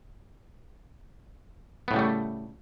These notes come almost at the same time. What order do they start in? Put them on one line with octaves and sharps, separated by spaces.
B3 A2 C#3 G3 A3